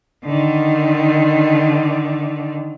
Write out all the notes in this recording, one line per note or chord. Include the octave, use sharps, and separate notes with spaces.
D3 D#3